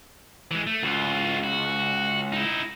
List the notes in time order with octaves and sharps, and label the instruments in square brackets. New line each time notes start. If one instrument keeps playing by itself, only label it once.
[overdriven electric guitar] E3 G#3
A3
[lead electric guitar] C#2 [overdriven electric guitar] F4 F#4
[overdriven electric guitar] F#4
D#4 E4